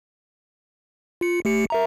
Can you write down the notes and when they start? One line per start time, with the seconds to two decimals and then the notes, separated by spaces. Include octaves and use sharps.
1.21 F4 C#7
1.45 A3 G4 C#7
1.70 A#4 E5 A#5